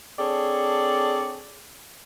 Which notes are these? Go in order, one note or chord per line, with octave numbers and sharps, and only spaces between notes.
C4 D4 G#4 A4 C#5 D5